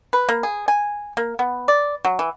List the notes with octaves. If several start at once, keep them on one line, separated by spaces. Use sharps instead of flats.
B4
A#3
G#4
G#5
A#3
B3
D5
F#3
E3